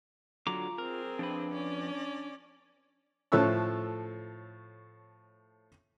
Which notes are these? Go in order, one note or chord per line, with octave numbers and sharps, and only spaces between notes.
D3 F#3 F4 A#5 D6
C4 G#4 A#4
F2 D4 B4
C#4 D5
A2 F3 A4 C#5 E6 F#6